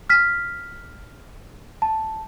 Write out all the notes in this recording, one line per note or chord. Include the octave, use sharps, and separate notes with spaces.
F6 B6
A5